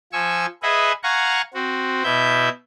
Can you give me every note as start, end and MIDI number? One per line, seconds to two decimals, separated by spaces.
0.13 0.46 53
0.13 0.46 80
0.13 0.46 85
0.13 0.46 88
0.63 0.92 68
0.63 0.92 71
0.63 0.92 75
0.63 0.92 76
0.63 0.92 78
0.63 0.92 80
1.03 1.42 77
1.03 1.42 78
1.03 1.42 80
1.03 1.42 82
1.03 1.42 85
1.54 2.03 60
1.54 2.03 66
2.04 2.49 47
2.04 2.49 64
2.04 2.49 76
2.04 2.49 91